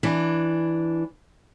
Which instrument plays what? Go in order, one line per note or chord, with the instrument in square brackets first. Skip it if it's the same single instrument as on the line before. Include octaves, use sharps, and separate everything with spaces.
[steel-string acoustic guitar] E3 D4